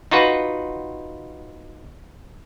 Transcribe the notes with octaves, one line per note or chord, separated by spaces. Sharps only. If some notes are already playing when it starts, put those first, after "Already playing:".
D#4 F4 F#4 B4 F#5